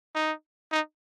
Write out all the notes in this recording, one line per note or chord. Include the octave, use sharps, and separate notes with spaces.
D#4
D#4